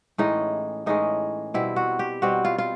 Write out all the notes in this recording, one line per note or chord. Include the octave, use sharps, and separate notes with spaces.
A2 E3 G#3 C#4 D#4
A2 E3 G#3 C#4 D#4
B2 G3 C4 E4
F#4
G4
B2 G3 C4 F#4
F4
F4